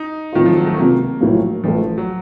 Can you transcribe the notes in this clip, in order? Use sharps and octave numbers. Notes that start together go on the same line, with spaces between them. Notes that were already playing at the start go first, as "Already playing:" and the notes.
Already playing: D#4
A2 D#3 A3 C4 F4
F3
F#3
A3
C#2 C3 F3 A#3 C4 F4
A#1 A2 F#3 A#3
A1 A2 F3 A3
F#3